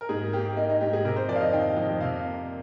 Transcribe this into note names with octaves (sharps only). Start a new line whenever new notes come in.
A#4
G#2 G#4
A#3 G4
A#3 D#4
D#4
G#2 G4
G#4
C3 A#4
C5
F2 D5
F5
D#5
D#3 G5
F2
C3 F5
A#3